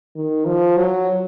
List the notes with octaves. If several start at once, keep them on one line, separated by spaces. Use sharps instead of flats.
D#3
F3
F#3